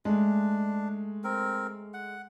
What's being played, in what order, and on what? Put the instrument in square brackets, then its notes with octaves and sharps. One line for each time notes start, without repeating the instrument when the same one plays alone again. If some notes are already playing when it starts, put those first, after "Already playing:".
[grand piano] G#3 A3 [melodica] D4
[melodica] C4 A#4
F#5